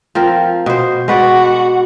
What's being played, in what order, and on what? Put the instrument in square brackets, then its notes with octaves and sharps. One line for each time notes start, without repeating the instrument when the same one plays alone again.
[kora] F3 C4 A#4
B2 C5
[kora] G#3 B4 D5 [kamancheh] F#4